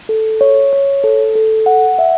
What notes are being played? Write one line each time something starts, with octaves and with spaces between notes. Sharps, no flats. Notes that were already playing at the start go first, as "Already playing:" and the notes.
A4
C#5
C#5
A4
A4
F#5
E5